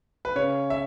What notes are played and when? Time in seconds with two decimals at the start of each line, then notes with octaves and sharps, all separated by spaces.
0.25 B4
0.36 C#3 C#5
0.70 E5